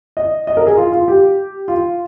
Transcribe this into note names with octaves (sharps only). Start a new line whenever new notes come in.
D#5
D#5
A#4
G#4
F4
F4
G4
F4